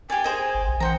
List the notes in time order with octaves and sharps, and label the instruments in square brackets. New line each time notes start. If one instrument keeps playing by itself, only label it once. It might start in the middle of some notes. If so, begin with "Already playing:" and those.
[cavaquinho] G4 D5 [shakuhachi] G#5
[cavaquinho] G#4 C5 D#5
[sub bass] G#1
A#1
[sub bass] E3 [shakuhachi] C5 [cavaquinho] F#5 G5 A#5